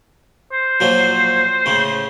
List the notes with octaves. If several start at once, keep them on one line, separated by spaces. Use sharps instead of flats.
C5
A#2 F3 F#3
A2 C#3